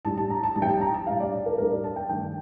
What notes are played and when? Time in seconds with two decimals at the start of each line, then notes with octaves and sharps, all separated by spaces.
0.05 A2 G3 D4 A5
0.18 A5
0.30 A#5
0.43 A5
0.56 A2 G3 D4 A5
0.62 G5
0.69 A5
0.81 A#5
0.94 A5
1.07 A2 G3 D4 F5
1.20 D5
1.46 A#4
1.58 A2 G3 D4 A#4
1.71 D5
1.84 A5
1.96 G5
2.09 G2 D#3 A3 D4 G5